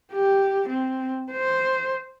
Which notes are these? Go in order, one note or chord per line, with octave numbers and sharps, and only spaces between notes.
G4
C4
C5